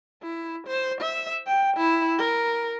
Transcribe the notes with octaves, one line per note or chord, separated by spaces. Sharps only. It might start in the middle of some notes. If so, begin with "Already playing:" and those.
E4
C5
E5
G5
E4
A#4